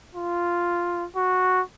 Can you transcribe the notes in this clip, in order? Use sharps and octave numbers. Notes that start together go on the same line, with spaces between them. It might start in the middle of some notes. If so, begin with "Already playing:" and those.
F4
F#4